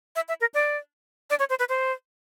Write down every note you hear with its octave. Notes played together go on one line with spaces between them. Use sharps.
E5
E5
A#4
D5
D5
C#5
C5
B4
C5